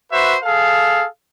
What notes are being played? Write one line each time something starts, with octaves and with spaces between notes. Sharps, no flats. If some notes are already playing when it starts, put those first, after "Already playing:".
F#4 B4 C5 E5
G#4 A4 F5